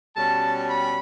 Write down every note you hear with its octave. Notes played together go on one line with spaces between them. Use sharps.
B2 G3 C#4 A5
B5